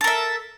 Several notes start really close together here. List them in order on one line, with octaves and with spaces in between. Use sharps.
A4 A#4 E5